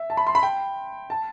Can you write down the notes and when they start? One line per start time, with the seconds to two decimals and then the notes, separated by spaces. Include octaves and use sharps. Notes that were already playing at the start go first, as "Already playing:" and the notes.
Already playing: E5
0.10 A5
0.17 B5
0.27 C6
0.35 B5
0.43 G5
1.10 A5